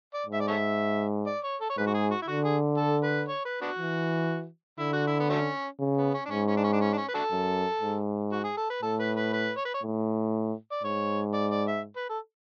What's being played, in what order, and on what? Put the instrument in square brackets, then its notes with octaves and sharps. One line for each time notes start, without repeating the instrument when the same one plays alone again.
[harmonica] D5
[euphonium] G#2
[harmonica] E5
D5
A4 C#5 E5
D5
C#5
A4
C#5
[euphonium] G#2 [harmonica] B4
[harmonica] F#4
G#4
F#4
E4
[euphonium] D3 [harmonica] F#4
[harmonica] G#4
A4
B4
C#5
B4
B3 D4 F#4
[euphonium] E3
[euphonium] D3 [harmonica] E4
[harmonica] F#4
E4
B3
F#3 A3 C#4
[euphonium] C#3
[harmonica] B3
C#4
D4
[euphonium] G#2 [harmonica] C#4
[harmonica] C#4
D4
C#4
D4
C#4
D4
C#4
B4
D4 F#4 A4
[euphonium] F#2
G#2
[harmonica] F#4
G#4
A4
B4
[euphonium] A2 [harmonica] A4
[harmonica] B4
B4
B4
C#5
B4
C#5
[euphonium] A2
[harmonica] D5
[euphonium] G#2 [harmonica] C#5
[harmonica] D5
D5
E5
B4
A4